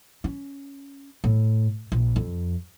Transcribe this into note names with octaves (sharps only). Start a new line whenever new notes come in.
C#4
A2
A#1
F2